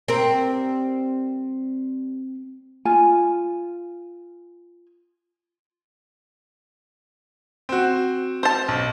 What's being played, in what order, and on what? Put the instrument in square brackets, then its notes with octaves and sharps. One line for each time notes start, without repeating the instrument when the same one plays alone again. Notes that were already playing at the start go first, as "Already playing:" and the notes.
[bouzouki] G3 G5 [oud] C4 A#4
[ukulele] F4 G#5
[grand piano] C4 F#4
[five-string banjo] C5 A5
[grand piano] B1